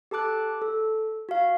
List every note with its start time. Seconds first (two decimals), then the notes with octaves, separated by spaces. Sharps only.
0.11 G4 A4 A5 D6 F#6
0.62 A4
1.29 F#4 F5